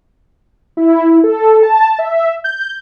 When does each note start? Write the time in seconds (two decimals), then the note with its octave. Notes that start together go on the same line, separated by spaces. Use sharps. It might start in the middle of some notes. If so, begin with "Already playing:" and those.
0.77 E4
1.24 A4
1.63 A5
1.99 E5
2.44 G6